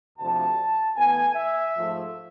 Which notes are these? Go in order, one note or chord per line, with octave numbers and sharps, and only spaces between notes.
D2 C3 F3 A5
A2 E3 B3 G#5
E5
G#2 F3 A3